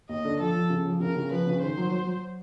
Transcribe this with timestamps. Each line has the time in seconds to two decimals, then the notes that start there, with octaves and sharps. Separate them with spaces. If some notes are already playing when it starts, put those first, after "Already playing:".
0.09 D#2 D#5
0.25 D3
0.39 F3 A4
0.55 F3
0.70 C#3
0.85 F3
1.00 C#3 A#4
1.16 C#3
1.31 F3 B4
1.47 C#3
1.61 D#3 C5
1.77 F#3
1.91 F#3
2.07 F#3